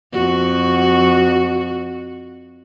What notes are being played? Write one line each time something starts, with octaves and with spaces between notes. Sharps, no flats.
F2 F#4